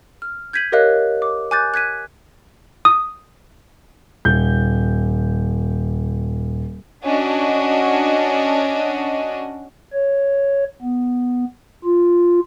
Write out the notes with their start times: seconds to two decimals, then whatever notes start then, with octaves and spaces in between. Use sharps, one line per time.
0.22 F6
0.53 G6 G#6 A#6 B6 D#7 F#7
0.72 G4 A#4 C#5 D#5 F5 F#6
1.22 D6
1.51 G#5 D6 F#6 G6 A6
1.74 F#6 G#6 B6 D#7
2.85 D#6
4.25 D#1 G6
7.04 C#4 D4 F#4 D#5
9.93 C#5
10.82 B3
11.84 F4